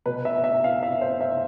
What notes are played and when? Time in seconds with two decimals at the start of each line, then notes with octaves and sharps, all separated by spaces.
0.06 B2 B4
0.25 E5
0.44 E5
0.64 F5
0.83 E5
1.01 C5
1.21 E5